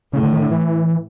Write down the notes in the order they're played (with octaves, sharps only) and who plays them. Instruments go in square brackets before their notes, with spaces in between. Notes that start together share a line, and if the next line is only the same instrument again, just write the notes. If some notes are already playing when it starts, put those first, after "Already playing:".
[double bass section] A2 [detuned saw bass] C#3
[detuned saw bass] D3
D#3
D3
E3